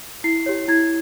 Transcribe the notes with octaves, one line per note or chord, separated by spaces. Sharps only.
E4 C7
G4 C#5
E4 G#6